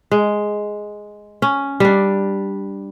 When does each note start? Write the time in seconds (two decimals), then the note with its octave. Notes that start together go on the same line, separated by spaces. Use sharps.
0.12 G#3
1.42 C#4
1.80 G3 D4